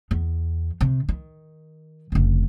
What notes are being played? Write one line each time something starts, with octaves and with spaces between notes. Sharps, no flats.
E2
C3
D#3
F1 C#3